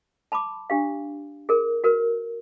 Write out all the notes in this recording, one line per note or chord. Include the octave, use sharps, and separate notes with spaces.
A5 B5 C6 D6
D4 G4 F5
G#4 A#4
F#4 A#4 B4